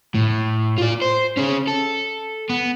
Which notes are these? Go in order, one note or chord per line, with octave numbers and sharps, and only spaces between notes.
A2
F4 D5
C5
C#4 G#4
A4
B3